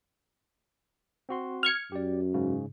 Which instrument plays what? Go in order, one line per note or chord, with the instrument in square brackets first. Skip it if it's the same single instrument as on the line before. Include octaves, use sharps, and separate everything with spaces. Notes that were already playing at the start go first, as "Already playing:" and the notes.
[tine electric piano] C4 F#4 C6
[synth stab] F6 G#6 C#7
[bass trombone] F#2 [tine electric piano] G4 D5
[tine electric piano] G#2 C#3